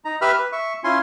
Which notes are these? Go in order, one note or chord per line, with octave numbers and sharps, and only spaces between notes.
D#4 A#5
G4 B4 E5 B5 F6
B4
E5 C#6
C#4 E4 F4 G#5 C6